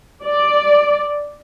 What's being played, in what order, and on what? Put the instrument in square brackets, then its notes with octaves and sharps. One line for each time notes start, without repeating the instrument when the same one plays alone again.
[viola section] D5